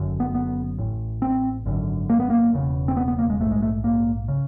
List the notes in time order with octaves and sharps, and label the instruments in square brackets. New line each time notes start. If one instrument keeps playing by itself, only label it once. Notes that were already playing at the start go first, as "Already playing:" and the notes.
Already playing: [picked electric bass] F#1 F#2 D3
B3
B3
A1 A2
C4
G#1 F#2 D3
A#3
B3
A#3
E1 E2 C#3
C4
B3
B3
A#3
G#3
A#1 G#2 A3
G#3
A3
A#3
C#3